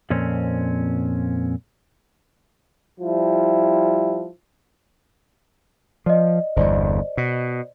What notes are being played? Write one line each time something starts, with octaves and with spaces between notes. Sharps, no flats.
F2 A#2 C4 C#4
F3 G3 E4
F3 D5 D#5
G1 E2 C5 D5 D#5
B2